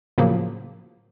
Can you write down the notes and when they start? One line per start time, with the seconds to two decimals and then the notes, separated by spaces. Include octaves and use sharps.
0.18 A2 C#3 F3 F#3 A#3